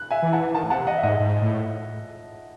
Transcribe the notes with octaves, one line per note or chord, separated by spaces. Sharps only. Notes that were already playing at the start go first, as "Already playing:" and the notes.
Already playing: F#6
E5 G#5
E3
F#5 A5
D#3 F#5 A5
A2
C3 F#5 A5
D#5 F#5
E5
G#2 D#5 F#5
G#2
A2